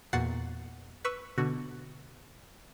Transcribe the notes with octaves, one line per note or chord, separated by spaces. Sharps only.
E2 A#2 F#4 F#5 A6 C7
B4 C#6 E6
B2 D3 F#4